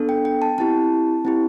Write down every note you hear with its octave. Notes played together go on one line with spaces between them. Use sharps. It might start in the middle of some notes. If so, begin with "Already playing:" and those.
Already playing: B3 D4 A4
G5
G5
A5
C4 E4 G4 A5
C4 E4 G4